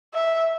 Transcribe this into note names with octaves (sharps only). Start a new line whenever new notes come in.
E5